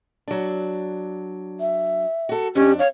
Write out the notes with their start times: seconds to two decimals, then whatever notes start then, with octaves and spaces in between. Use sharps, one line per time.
0.28 F#3 D4
1.60 E5
2.29 F#4 A4
2.55 F2 C#4 D4 G4
2.79 C#5 F5